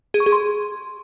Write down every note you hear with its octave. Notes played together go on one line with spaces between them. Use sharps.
G#4
C#6
G#4
C6